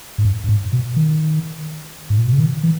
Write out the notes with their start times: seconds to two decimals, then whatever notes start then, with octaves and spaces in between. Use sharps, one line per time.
0.18 G#2
0.25 G2
0.44 G2
0.49 G#2
0.73 B2
0.96 D#3
2.10 G#2
2.18 A#2
2.26 B2
2.33 C#3
2.39 D#3
2.63 E3